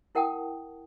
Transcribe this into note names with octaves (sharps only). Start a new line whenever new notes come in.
E4 A#4 F#5 G5 A5 D#6